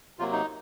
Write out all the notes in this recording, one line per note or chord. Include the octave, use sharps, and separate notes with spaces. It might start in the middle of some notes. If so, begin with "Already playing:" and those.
C3 F#3 A#3 F4
D#4